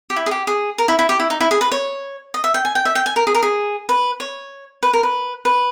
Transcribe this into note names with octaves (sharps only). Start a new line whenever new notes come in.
G4
E4
G#4
G4
G#4
A#4
E4
E4
G4
E4
D#4
E4
G#4
B4
C#5
D#5
E5
G5
G#5
G5
E5
G5
G#5
A#4
G#4
A#4
G#4
B4
C#5
B4
A#4
B4
B4